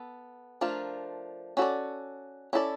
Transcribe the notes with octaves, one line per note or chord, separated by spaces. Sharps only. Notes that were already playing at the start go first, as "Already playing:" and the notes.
Already playing: B3 A4
F3 A3 D4 F4 A#4
C#4 F#4 A4 D5
C#4 E4 A4 D5